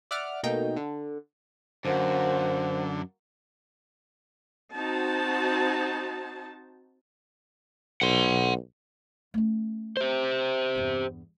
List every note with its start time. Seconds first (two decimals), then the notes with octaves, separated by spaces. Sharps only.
0.11 D5 E5 F#5 D6 F6
0.43 B2 A3 A#3 D#4 G5
0.76 D3
1.85 F#2 D3 A#3 F#4 C5
4.74 C4 D#4 F#4 C5 A5
8.01 B1 F#5 C6
9.34 A3 C#4
9.97 G4 C5
10.75 E2 G2